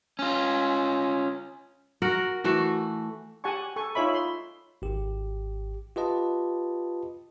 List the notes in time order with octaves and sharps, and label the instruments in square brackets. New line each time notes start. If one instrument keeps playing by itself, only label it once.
[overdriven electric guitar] C#4 F4
[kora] F#4 A#4 F#5
E3 A3 F#4
[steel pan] G4 F#5 G#5 A5 C#6
A4 G#5 C#6
D#4 F4 C#5 E5 B5
C6
[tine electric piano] G#1 G4
F4 G4 B4 D#5 A5